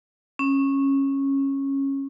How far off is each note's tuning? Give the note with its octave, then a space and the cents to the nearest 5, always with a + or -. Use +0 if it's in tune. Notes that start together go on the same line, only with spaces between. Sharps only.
C#4 -15